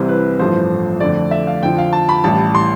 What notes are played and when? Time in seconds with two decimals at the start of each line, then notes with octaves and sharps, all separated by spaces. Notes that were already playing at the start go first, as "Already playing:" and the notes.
Already playing: C2 C3 E3 G3 C5
0.09 B4
0.39 A1 G2 F3 A3 C5
1.00 F2 D3 A3 D5
1.31 E5
1.47 F5
1.63 F2 D3 F3 G5
1.78 F5
1.93 A5
2.09 B5
2.24 A1 A2 G3 A5
2.55 C6